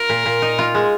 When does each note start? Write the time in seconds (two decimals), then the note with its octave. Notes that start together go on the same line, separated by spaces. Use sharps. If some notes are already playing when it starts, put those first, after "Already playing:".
Already playing: F4 A#4
0.09 A#2
0.26 A#2
0.42 D#4
0.59 F4
0.75 G#3